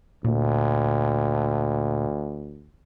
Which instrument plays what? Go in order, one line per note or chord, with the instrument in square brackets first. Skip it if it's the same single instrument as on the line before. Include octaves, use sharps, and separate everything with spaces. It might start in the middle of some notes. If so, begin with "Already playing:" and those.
[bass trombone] D2 [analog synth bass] A#2